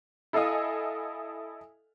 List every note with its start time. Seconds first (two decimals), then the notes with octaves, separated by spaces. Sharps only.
0.33 E4 A4 D#5 F5 G#5 D#6